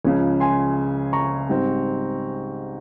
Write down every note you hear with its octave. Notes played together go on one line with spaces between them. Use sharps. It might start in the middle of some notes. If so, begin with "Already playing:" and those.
C#2 C#3 F3 C#5
G#5 C6
A#5 C#6
G#2 G3 C4